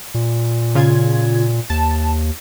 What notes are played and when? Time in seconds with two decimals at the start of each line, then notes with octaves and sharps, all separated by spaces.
0.14 A#2
0.75 C#3 F4 G#6
1.70 D#2 A5